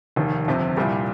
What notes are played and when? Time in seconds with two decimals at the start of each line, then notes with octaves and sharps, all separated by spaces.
0.16 F1 D#2 D#3
0.47 G1 F2 C3
0.77 C2 A#2 G3